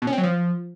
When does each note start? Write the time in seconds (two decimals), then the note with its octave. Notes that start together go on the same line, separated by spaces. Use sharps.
0.02 B2
0.07 C#4
0.13 C4
0.18 F#3
0.23 F3